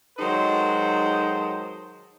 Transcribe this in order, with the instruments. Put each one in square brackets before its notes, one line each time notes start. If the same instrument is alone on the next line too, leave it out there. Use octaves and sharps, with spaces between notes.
[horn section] D#3 F#3 G#3 D#4 A4 C5